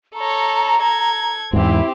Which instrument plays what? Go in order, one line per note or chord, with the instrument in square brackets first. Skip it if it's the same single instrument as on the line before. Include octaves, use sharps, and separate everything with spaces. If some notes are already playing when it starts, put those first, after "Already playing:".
[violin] A4 C#5 [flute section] A#5
[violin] A4 G#6
[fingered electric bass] E2 G#2 [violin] C4 G4 [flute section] E4